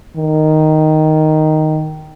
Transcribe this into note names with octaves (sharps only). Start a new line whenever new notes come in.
D#3